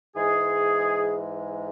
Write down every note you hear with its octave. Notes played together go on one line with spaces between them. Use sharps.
G#2 E3 G#3 G#4